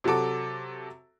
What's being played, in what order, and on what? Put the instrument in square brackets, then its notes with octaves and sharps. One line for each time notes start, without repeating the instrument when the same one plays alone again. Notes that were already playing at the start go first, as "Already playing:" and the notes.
[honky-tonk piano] C3 F#3 F#4 A4 D6